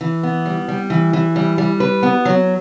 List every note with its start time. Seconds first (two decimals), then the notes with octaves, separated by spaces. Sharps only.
0.01 E3
0.23 B3
0.46 G3
0.68 G3
0.90 E3
1.13 E3
1.36 G3
1.58 G3
1.80 B4
2.03 B3
2.25 F#3